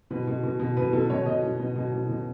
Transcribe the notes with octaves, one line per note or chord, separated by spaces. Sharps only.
B2 B4
B2
B2
B2
B2 B4
B2 A4
B2 C#5
B2 D#5
B2
B2
B2
B2
B2